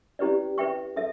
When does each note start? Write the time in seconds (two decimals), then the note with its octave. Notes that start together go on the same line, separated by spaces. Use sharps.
0.19 C#4 E4 G4 B4 D5
0.58 B4 E5 G5 C#6
0.96 A4 E5